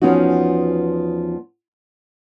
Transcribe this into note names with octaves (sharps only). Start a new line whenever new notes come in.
E2 F3 B3 C#4 D#4 F#4